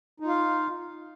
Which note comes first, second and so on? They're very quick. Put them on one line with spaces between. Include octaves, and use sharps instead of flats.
D#4 F4 F5